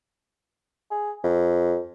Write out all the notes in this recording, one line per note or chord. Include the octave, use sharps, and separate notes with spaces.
G#4
F2